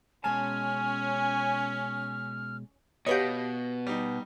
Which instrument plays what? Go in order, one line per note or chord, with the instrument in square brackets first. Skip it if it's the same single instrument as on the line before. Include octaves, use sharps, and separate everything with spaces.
[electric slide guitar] B2 G#3 A5 [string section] C#4 [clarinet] G#5 [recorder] F6
[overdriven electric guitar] B2 [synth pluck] G4 B4 C#5 [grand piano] D#5 F5 F#5
[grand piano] G3 D#4